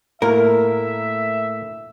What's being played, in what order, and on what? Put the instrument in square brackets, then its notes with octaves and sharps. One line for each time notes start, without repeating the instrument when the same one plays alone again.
[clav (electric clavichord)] A2 A#3 [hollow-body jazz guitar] A#4 [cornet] E5